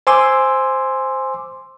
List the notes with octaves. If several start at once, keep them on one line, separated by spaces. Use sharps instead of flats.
C5 G#5 C6 D6 E6